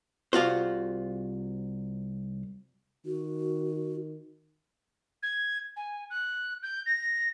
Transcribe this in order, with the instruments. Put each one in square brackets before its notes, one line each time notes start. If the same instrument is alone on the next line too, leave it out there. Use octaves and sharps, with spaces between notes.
[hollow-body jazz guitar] C2 F4 F#4 C5
[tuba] D#3 [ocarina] F#4
[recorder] G#6
G#5
F#6
G6
A#6